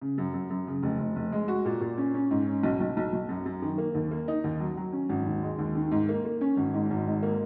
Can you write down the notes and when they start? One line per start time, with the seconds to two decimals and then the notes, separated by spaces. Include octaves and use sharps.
0.01 C#3
0.18 F#2
0.34 F#2
0.50 F#2
0.67 C#3
0.83 F1
0.99 F1
1.16 F1
1.32 G#3
1.48 F#4
1.65 A#2
1.81 A#2
1.98 C#4
2.14 C#4
2.31 G#2
2.47 C#4
2.63 B1
2.80 B1
2.97 B1
3.13 B1
3.29 F#2
3.46 F#2
3.62 D#3
3.78 A#3
3.95 D#2
4.11 A#3
4.28 D#4
4.44 D#2
4.60 F#3
4.77 F#3
4.93 C#4
5.09 G#1
5.26 D#2
5.43 G#3
5.59 D#2
5.75 D#3
5.91 G#2
6.09 A#3
6.25 A#3
6.41 C#4
6.57 G#1
6.74 G#2
6.90 G#1
7.07 G#2
7.23 A#3